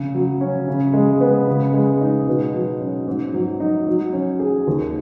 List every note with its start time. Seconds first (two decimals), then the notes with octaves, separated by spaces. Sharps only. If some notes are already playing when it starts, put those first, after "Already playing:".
Already playing: C#3
0.15 F#3
0.41 C#4
0.68 C#3
0.93 G#3
1.21 B3
1.48 C#3
1.73 G#3
2.01 D#4
2.27 B2
2.53 F#3
2.80 C#4
3.07 G#2
3.34 F#3
3.60 D#4
3.87 F#3
4.13 C#4
4.40 G#4
4.67 D#2